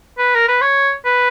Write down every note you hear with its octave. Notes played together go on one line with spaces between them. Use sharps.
B4
A#4
B4
C#5
B4